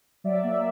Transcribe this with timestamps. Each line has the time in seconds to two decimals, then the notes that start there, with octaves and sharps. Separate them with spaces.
0.24 F#3 D5 E5
0.43 A#3
0.51 E5